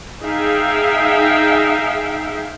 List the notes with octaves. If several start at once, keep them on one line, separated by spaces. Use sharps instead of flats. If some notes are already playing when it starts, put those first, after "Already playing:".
D#4 G#4 E5 F5 G5